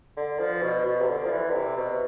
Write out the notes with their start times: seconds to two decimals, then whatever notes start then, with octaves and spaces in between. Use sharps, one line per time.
0.16 D3
0.39 F3
0.62 B2
0.85 B2
1.01 C3
1.08 D3
1.26 F3
1.31 E3
1.50 D3
1.53 C3
1.77 B2